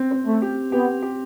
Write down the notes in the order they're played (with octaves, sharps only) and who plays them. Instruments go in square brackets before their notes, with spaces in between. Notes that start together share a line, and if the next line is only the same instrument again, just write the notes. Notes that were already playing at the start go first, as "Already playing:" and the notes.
Already playing: [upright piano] C4
C4
[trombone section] A3
[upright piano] G4
[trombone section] B3 [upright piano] G4
[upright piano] G4